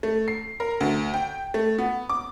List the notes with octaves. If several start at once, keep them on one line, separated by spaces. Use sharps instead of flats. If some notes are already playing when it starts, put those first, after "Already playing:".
A3
C7
A#4
D2
G5
A3
B3
D6